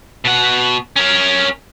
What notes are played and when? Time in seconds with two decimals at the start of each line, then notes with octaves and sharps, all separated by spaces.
0.25 B2 F#5
0.96 C#4 A#4